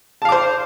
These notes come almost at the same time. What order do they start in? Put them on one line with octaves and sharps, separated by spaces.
A5 F5 D6 C5